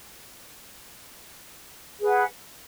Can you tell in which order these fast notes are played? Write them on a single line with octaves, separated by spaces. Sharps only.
G#4 B4 F#5